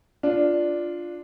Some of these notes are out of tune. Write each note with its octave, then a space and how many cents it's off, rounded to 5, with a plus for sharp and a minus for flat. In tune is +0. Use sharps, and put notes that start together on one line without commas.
D4 +0 F4 +0